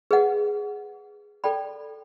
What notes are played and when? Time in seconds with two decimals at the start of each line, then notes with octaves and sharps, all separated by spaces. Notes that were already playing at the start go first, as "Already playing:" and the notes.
0.11 G#4 B4 D#5 F#5
1.44 A4 D5 G5 B5